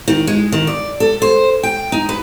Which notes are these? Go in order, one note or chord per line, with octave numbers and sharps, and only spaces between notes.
D#3
G#3
D#3
D5
A4
C5
G5
D#4
B4